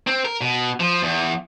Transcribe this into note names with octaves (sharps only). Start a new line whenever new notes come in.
C4
A#4
B2
F3
E2